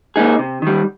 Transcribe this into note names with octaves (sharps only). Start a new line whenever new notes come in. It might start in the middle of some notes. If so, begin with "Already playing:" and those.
A#3 D#4 G#4
C3
D#3 G3